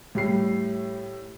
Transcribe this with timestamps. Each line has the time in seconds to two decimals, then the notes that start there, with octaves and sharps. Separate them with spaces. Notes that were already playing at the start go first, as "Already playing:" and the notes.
0.15 A2 G3 C7